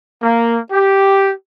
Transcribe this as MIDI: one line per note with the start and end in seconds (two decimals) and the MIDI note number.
0.22 0.56 58
0.72 1.31 67